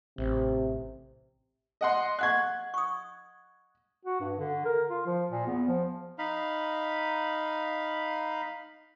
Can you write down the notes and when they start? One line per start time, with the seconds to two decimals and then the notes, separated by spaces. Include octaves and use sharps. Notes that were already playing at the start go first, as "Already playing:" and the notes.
0.18 A1 C3
1.81 D#5 F#5 C6
2.19 D#5 F#5 C#6 F#6 G#6
2.74 C#6 D#6
4.05 F#4
4.21 G2
4.39 D3
4.65 A#4
4.90 F4
5.06 F3
5.31 A#2
5.47 E2
5.68 F3
6.19 D#4 F5 B5